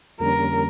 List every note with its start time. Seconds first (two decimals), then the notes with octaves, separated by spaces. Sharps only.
0.20 F2 D3 G3 A#3 C#4 A#4